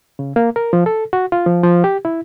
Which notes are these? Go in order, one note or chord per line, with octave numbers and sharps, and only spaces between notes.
C#3
A#3
A#4
F3
A4
F#4
F4
F3
F3
G4
E4